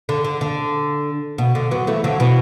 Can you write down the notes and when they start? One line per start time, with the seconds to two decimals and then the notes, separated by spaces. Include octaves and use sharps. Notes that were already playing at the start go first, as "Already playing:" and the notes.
0.09 D3
0.24 D3
0.41 D3
1.38 B2
1.55 D3
1.71 F#3 B3
1.87 E3 A3
2.04 D3 F#3
2.20 B2 E3